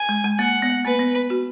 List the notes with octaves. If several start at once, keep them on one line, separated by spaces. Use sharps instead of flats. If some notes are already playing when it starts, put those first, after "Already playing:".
Already playing: G#5
G#3
G#3
A#3 F#5
B3
A#3 B4
B3
F#4